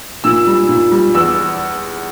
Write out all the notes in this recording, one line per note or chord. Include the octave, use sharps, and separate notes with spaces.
A#2 E6
G3
A#2
G3
E2 E6